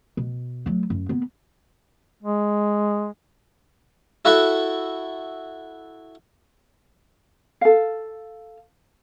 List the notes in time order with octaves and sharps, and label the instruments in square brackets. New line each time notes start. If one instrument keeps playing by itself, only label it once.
[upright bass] B2
F#3 A3
F#2
A#3 B3
[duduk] G#3
[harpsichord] E4 F#4 A4 F#5 B5 C#6
[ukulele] A4 F5